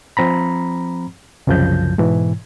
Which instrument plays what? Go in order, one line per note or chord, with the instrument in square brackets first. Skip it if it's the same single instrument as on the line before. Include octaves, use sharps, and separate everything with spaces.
[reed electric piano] F3 C4 A#5 B5
C2 F#2 C#3 F3 G6
G#2 B2 E3